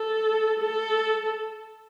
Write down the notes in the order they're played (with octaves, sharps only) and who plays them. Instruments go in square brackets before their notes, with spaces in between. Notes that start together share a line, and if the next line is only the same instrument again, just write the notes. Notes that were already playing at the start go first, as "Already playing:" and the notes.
Already playing: [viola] A4
A4